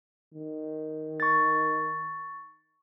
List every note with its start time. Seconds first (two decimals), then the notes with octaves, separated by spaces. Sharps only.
0.34 D#3
1.20 C#6 A6